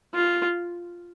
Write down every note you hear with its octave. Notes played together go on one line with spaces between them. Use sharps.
F4